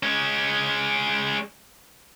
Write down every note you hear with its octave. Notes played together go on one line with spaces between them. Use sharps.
G#3 C#4